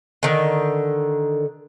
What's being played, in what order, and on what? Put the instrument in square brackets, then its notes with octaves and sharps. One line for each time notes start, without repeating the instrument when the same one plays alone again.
[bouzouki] D3 D#3